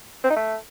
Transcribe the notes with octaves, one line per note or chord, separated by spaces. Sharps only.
C4
D#4
A3